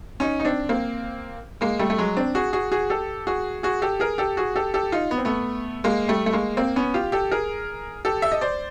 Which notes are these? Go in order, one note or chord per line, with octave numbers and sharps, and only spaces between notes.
C#4 D#4
D#4
C4 D4
A#3 C4
G#3 A#3
G3 A3
A3
F#3 G#3
C4 D4
F#4 G#4
F#4 G#4
F#4 G#4
G4 A4
F#4 G#4
F#4 G#4
G4 A4
G#4 A#4
G4 A4
F#4 G#4
G4 A4
G4 A4
D#4 F4
B3
C4
A3 B3
G#3 A#3
G3 A3
A3
G#3 A#3
A#3 C4
B3 C#4
F4 G4
G4 A4
G#4 A#4
G4 A4
E5
D#5
C5 D5